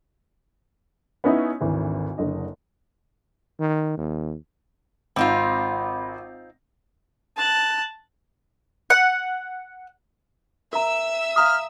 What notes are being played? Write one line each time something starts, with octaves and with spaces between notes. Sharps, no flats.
B3 C#4 D#4 E4
G#1 D2 E3
F#1 D3 D#5
D#3
D#2
G#1 C4 D#4 F4 B5
A5 F#6
F#5
A#4 E5 A#5 E6
F5 A#5 D#6 F6